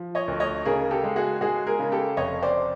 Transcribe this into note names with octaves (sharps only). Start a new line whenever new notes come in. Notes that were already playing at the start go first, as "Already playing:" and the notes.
Already playing: F3
C#5 D#5
D2
C#5 D#5
C#3 G#4 A#4
G4 A4
G#3
F#4 G#4
G#3 F#4 G#4
G#4 A#4
C#3
G4 A4
F1 C#5 D#5
C5 D5